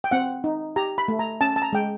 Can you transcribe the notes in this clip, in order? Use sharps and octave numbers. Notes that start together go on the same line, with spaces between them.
G5
C4 F#5
D#4
G4 A#5
B5
A3
A#5
C#4 A5
A5
A#5
G#3 G5